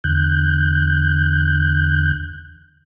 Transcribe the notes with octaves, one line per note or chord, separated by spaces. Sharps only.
E2 D3 F#6 G6